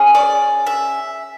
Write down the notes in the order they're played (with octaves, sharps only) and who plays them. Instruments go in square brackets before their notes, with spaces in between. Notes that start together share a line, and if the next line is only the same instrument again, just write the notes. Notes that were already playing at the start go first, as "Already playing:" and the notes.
Already playing: [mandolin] C#4 G#4
D5
E5